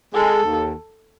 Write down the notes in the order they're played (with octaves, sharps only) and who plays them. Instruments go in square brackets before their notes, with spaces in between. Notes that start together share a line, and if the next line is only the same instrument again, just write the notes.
[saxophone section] G#3 [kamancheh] A4
[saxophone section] D#2